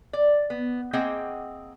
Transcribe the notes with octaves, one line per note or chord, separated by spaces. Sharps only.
D5
B3
A#3 C4 G#4 D#5 F#5 G5